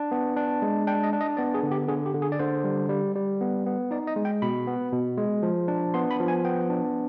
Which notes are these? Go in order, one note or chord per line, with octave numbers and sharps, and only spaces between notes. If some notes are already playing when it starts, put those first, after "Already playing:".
Already playing: D4
B3
D4
G#3
D4 G5
D#5
D4
D#5
B3 D5
G#4
D3
G4
D3 G#4
G4
D3
G#4
D5
D3 C5
G3
G3
G3
B3
B3
D#4 D5
D#5
G#3
G5
B2 B5
B3
B2
G#3
F3
D4
B3 C6
B5
F3
G#5
B3 G5
D4